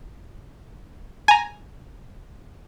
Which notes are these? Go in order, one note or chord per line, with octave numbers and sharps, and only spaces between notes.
G#5 A#5